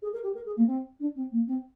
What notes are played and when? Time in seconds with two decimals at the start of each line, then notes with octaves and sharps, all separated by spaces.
0.02 G#4
0.13 A#4
0.23 G4
0.35 A#4
0.46 G#4
0.56 A#3
0.67 C4
1.00 D4
1.16 C4
1.31 A#3
1.47 C4